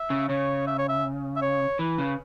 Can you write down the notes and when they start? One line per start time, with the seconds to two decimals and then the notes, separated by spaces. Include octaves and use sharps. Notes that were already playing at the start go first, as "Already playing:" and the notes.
Already playing: E5
0.10 C#3
0.29 C#3 C#5
0.67 E5
0.79 C#5
0.89 E5
1.36 E5
1.42 C#5
1.79 E3 B4
1.98 C#3